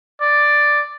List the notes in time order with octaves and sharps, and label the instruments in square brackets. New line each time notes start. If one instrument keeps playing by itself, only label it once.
[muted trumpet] D5